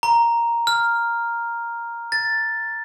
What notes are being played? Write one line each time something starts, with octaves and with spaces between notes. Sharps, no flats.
A#5
F6
A6